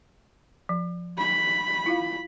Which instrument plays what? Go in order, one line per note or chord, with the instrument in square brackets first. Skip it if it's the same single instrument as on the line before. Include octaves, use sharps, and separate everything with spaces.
[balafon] F3
[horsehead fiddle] B5
[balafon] E4 F4 F5